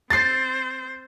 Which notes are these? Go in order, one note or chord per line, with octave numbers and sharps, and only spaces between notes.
C4 C5 A6 C7